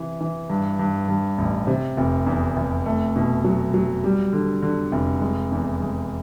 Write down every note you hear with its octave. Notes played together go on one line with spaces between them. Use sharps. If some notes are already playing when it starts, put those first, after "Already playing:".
Already playing: C3 E3
E3
G2
G2
G2
A1
C3
F1
E2
F1
A3
B2
F#3
F#3
G3
D3
D3
F1
G#3
E2
G#3